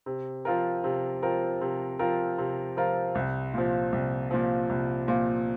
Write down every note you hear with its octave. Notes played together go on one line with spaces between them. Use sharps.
C3
F3 C4 F4 A#4
C3
F3 C4 F4 A#4
C3
F3 C4 F4 A#4
C3
F3 C4 F4 A#4
C2
A#2 F3
C2
A#2 F3
C2
A#2 F3